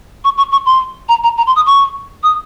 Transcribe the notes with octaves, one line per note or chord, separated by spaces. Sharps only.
C#6
C#6
C#6
C6
A#5
A#5
A#5
C6
D#6
C#6
D#6